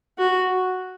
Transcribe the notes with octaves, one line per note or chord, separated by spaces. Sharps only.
F#4